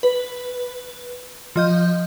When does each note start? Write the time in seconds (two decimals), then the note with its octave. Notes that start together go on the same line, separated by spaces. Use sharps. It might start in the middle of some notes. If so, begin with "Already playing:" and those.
0.03 B4
1.56 F3 D#5 G6